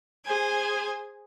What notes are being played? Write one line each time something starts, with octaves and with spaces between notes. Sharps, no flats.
G#4 C5 G#5